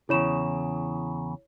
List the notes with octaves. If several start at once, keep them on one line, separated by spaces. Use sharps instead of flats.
E2 A#2 C#3 E4 C#5 E7